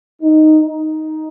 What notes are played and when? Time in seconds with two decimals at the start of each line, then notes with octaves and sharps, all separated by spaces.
0.22 D#4
0.63 D#4